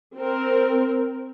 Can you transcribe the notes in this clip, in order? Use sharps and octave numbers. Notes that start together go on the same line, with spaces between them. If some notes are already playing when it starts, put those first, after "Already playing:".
C4 A#4